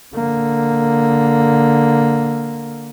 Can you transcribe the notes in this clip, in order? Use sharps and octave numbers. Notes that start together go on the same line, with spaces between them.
D3 A#3